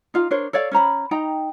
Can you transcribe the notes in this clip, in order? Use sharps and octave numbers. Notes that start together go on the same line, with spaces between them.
D#4 F4 F5
D4 A#4 C5 C#5
A4 C#5 D5 F5
C#4 C5 A#5 B5
D#4 G5 A#5